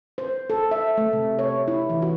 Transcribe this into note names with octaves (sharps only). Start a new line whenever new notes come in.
C5
A4
E5
A3
C3
C#5
E4
E3
F#4